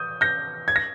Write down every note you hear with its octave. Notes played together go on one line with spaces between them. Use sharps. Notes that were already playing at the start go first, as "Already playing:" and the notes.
Already playing: D#6 G6
G6 A#6
G#6
A#6